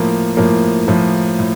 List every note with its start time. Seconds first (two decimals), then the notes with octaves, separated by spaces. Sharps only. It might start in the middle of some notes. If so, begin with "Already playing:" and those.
Already playing: A2 F3 A#3
0.37 A2 F3 A#3
0.87 A2 F3 A#3
1.39 A2